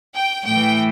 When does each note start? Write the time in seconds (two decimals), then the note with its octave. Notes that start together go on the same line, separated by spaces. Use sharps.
0.15 G5
0.45 A2 E3 G5